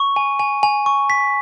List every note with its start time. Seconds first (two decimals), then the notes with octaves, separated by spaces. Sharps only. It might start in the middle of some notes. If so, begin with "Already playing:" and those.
Already playing: C#6
0.16 G#5
0.39 G#5
0.63 G#5
0.86 C#6
1.10 B6